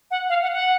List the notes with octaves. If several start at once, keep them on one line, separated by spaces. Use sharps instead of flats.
F#5
F5
F#5
F#5